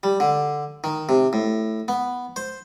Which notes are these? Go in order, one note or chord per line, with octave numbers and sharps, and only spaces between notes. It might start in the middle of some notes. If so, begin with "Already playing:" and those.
G3
D3
D#3
C3
A2
B3
C5